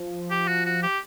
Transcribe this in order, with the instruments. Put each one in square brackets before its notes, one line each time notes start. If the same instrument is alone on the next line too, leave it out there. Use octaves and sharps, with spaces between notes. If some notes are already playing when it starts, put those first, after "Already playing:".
Already playing: [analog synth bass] F3
[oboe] G4
F#4
F#4
G4